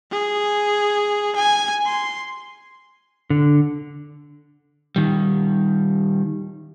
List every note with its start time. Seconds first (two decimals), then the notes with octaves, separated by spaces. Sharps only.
0.11 G#4
1.36 G#5
1.86 C6
3.30 D3
4.96 D#3 G3